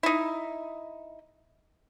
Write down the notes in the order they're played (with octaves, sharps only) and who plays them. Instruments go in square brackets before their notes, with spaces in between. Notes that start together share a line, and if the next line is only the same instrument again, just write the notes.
[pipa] D#4 E4